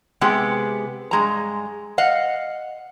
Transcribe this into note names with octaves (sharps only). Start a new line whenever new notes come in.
C3 G#3 B3 G4
G2 G#3 A#5
D#5 F5 F#5